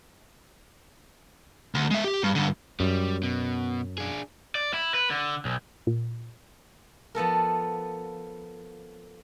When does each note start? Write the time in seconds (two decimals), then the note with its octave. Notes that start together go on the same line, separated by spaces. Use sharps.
1.75 D2
1.91 G#3 E5
2.04 G4
2.24 G2
2.35 G2 D3
2.80 F#2 G3
3.23 B2
3.98 D4 G#4
4.55 D5
4.74 E4
4.94 B4
5.10 D3
5.45 B1
5.87 A#2
7.15 F3 B3 A4 A#4